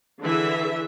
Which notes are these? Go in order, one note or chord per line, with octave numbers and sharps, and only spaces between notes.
D3 E3 G#4 E5